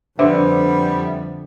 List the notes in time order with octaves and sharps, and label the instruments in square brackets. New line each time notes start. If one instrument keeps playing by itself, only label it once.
[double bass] F2 [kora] D3 [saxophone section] G3 B3 [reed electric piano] C5 E5